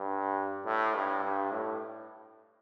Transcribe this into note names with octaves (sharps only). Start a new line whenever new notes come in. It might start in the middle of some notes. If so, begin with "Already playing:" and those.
Already playing: G2
A2
G2
G2
A2